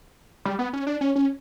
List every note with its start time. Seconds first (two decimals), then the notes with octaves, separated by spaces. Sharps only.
0.45 G3
0.59 B3
0.73 C#4
0.87 D4
1.01 C#4
1.16 C#4